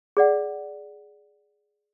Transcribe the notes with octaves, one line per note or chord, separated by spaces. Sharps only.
G#4 D5 F#5